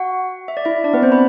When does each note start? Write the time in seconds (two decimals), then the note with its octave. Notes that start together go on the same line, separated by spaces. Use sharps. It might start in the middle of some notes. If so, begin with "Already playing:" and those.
Already playing: F#4 F#5
0.48 E5
0.57 D5
0.65 E4 E5
0.84 D4 D5
0.93 B3 B4
1.02 C4 C5
1.12 B4 B5